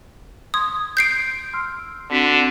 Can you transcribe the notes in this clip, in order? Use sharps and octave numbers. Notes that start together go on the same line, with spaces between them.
C6 D#6 G#6
G6 C7 D7
C6 E6 F6
D3 C4 D4 F#4 C6 B6